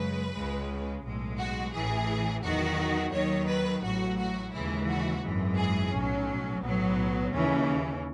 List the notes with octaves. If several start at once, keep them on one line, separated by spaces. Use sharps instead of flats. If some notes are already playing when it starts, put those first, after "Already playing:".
Already playing: F#2 C#3 G#3 B4
C#2 C#3 G#3
B1 A2 G#3
F#4
A1 A2 E3 G#4
E2 D#3 F#3 F#4
D#2 D#3 F#3 C#5
B4
A1 A2 F#3 F#4
F#4
D#2 C#3 E3 G#3 E4
F#4
G#1 F#2 E3 G#3
G#4
B1 A2 F#3 C#4
B1 A2 F#3 B3
D#2 C#3 E3 C#4